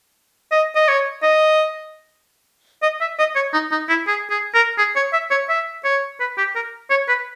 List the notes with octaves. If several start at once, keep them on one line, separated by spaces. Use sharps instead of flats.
D#5
D#5
C#5
D#5
D#5
E5
D#5
C#5
D#4
D#4
E4
G#4
G#4
A#4
G#4
C#5
E5
C#5
E5
C#5
B4
G4
A#4
C#5
B4